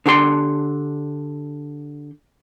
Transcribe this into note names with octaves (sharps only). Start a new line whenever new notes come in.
D3 D4 G4 C6